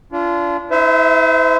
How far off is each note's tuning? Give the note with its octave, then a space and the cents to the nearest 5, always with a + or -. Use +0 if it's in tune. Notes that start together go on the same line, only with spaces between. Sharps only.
D4 -30 F4 -25
E4 -35 C5 -40 E5 +10